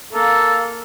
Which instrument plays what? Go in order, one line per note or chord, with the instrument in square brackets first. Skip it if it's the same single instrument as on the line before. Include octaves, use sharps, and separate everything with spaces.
[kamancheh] A#3 F5 [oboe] A4